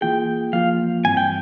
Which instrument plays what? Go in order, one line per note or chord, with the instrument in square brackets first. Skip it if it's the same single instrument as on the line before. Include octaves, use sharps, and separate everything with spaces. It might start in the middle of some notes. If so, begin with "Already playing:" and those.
[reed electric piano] E3 A#3 F4 G#4 [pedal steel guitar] G5
[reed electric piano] F3 A#3 F4 [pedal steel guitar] F5
[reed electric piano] G2 E3 G3 C4 [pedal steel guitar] G#5
[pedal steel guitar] G5